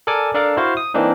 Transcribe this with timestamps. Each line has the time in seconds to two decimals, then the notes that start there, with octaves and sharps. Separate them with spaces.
0.07 A4 A#4 D5 G#5 D6
0.34 D4 A4 A#4 D5 F5
0.57 E4 F#4 C5 F5
0.77 D#6
0.94 E3 A#3 C4 D4 D#4